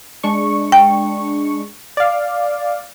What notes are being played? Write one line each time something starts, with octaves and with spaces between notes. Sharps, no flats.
G#3 D4 C#6
G5
D5 F5